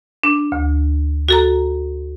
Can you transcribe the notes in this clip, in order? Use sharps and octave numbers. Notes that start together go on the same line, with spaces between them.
D4
D2
F#4 A4 A#5